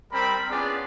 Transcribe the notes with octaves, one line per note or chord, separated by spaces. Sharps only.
G3 C4 A#4 B5
B3 C#4 D4 F4 G#4 D5